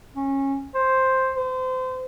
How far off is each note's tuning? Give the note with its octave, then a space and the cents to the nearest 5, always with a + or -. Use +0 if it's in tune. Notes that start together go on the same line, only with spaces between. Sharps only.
C#4 -20
C5 +5
C5 -30